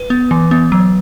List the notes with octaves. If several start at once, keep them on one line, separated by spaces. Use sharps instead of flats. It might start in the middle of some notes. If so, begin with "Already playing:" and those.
Already playing: B4
B3
E3
B3
F#3